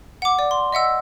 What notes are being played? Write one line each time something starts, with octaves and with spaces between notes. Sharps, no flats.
F#5 D6
D5
C6
D#5 E5 F#5 E6